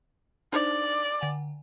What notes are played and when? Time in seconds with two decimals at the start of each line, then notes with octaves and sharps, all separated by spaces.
0.53 D4 D#4 C5 D5
1.21 D3 F#5 G#5